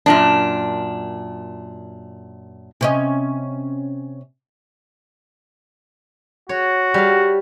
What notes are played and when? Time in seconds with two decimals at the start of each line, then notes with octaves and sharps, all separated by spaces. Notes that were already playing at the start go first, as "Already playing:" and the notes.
0.06 F#2 A#2 D4
2.81 C3 C#4 D#5
6.49 F#4 C#5
6.94 G3 F5